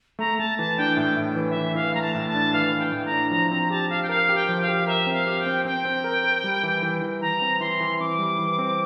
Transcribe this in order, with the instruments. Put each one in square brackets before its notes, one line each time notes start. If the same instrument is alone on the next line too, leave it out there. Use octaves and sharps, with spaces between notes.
[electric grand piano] A3 [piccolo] A#5
[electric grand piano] A3 [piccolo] A5
[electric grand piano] E3 [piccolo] A5
[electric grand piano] D4 [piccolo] G5
[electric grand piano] A2 [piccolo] G5
[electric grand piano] A2
E3
[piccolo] E5
[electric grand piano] E3
[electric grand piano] E3 [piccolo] F5
[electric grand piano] A3 [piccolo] A#5
[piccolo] A5
[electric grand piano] A2
[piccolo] A5
[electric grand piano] D4
[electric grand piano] E3 [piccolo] F5
[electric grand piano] E3
[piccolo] G5
[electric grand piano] A2
[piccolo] A#5
[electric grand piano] D4
[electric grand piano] F3 [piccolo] A#5
[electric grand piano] C4 [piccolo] A#5
[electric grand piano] G4 [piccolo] A5
[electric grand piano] G4 [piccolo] F5
[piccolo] G5
[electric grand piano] A#4 [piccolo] F5
[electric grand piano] G4
[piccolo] G5
[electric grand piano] F3
[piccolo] F5
[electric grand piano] G4
[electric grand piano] A#4 [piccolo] E5
[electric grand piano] C4
[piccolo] F5
[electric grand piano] G4
[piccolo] G5
[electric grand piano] C4
[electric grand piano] C4 [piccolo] G5
[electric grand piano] C4
A#4
A#4
G3
E3
E3
E3
[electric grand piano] E3 [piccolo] A#5
[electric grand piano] C4
[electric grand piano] E3 [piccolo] C6
[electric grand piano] E3
[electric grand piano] C4 [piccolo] D6
[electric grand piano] G3
E3
C4